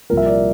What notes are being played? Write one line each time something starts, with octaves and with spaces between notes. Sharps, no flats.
C2 A#2 F3 A#4
E5
D5